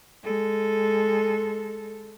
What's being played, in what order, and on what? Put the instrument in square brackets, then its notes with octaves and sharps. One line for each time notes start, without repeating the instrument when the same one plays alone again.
[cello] G#3 A4